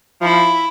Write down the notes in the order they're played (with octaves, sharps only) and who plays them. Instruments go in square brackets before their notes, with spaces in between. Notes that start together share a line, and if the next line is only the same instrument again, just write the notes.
[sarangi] F3 [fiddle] E4